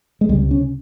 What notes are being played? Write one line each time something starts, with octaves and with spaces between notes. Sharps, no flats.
G#3
C#2 C3 G3
C#4